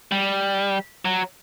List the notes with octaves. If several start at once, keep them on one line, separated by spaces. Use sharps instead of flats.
G3
F#3